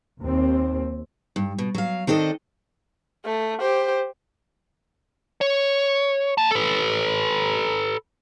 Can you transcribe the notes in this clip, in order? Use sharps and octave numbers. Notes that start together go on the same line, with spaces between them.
D#2 C4
G2
B2
F#3 F5
D#3 C4 D4 A4 D#5
A3
G4 C5
C#5
A#3 A5
A4 B4